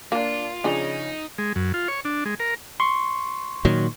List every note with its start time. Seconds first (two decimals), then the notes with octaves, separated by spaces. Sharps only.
0.12 A#3 D4 F4
0.64 C#3 F3 D4 D#4 G#4
1.38 G#3
1.56 F#2
1.74 F4
1.88 C#5
2.05 D4
2.25 G#3
2.40 A#4
2.80 C6 C#6
3.65 A#2 D#3 F#3